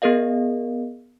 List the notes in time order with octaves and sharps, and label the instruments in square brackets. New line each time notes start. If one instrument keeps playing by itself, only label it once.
[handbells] B3 G#4 A#4 D#5 F5